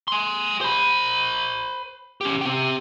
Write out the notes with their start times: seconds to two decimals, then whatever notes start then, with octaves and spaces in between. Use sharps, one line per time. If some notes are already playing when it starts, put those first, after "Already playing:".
0.08 G#5 C6
0.61 C5 B5
2.21 C#4 G4
2.41 C4 G4